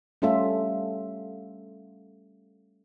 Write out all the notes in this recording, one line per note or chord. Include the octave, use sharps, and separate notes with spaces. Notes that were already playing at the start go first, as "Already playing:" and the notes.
G3 A3 C#4 F4 A4 E5